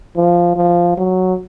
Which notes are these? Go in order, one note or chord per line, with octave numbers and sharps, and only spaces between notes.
F3
F3
F#3